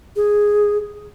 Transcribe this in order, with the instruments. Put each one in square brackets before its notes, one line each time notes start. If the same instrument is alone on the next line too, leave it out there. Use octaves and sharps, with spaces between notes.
[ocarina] G#4